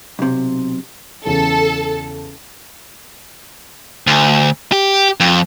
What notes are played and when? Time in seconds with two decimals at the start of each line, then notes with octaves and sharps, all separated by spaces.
0.19 B1 C3
1.26 E2 C#3 A4
4.07 D2
4.72 G4
5.20 F2